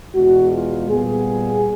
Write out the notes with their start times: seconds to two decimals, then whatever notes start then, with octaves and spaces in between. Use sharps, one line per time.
0.13 E2 B2 G#3 F#4
0.51 F4
0.89 A#2 G3 B3 G#4